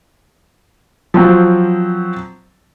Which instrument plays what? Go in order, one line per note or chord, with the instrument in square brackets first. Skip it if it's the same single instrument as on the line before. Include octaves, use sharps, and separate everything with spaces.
[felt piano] F3 F#3 C4